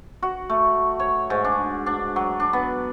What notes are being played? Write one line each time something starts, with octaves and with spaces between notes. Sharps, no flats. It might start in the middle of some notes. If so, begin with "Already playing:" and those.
F#4
A3
C#5
G#2
D4
D4
F#3
D4
B3